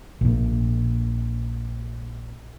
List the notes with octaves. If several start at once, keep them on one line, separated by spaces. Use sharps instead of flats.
A#1 A#2